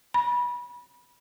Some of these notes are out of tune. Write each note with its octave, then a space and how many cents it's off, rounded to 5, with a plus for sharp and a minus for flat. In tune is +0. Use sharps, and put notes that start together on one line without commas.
B5 -25